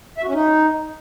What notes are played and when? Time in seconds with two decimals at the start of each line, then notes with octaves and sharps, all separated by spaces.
0.18 E5
0.23 F#4
0.28 C#4
0.34 D#4